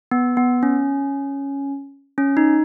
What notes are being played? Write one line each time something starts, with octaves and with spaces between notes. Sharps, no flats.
B3
B3
C#4
C#4
D#4